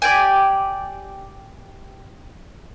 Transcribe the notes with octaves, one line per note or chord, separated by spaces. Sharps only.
G4 D5 G5 G#5